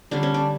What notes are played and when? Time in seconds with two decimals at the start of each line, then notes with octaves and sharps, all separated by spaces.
0.11 D3 G3 C#4 D4
0.23 C#4
0.34 D4